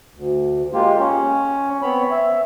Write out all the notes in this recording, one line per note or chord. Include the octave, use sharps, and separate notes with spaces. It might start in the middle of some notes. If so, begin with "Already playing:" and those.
D2
G#3 A#3 F4 G4
C#4
B3 C4 C#5 B5
E5